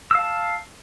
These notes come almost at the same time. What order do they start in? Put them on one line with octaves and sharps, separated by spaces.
E6 F5 A5